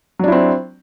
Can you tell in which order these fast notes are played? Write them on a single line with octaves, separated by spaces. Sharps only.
F#3 D4 E4 C4